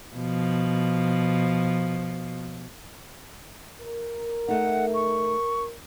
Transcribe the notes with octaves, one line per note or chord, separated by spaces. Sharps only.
B2 F3
A#4
A3 D#4 F#5
C#6